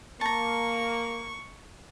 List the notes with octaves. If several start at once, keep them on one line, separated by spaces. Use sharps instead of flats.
A#3 A5 A#5 C#6